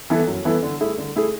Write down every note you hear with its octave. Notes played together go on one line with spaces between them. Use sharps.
E3 B3 E4 A4
F#2
E3 B3 E4 A4
D3
A3 E4 G#4
D3
A3 E4 G#4